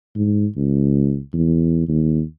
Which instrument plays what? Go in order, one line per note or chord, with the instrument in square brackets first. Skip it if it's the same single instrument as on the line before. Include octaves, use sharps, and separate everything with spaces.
[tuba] G#2
C#2
E2
D#2